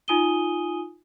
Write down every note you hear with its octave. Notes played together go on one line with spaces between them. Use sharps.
D#4 F4 G#5 D#6 D#7 G7